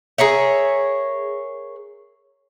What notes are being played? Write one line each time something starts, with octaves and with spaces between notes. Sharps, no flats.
G#4 A#4 C#5 E5